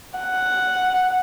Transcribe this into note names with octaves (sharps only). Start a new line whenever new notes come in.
F#5